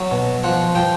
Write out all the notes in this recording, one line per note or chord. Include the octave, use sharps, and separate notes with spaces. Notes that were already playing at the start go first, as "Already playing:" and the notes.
Already playing: F#3
B2
F3 F#5
F3 G5